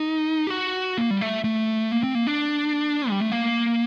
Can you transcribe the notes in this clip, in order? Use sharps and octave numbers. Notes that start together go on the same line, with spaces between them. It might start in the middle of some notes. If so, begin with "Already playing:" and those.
Already playing: D#4
G4
F#4
A#3
G3
A3
A3
A#3
C4
A#3
D4
G3
A3
A#3